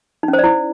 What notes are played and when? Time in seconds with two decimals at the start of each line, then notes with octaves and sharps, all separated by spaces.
0.23 D#4
0.28 C#4
0.33 C5
0.39 D5
0.44 E4